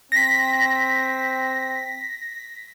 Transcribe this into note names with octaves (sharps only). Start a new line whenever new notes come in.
C4 A#6 B6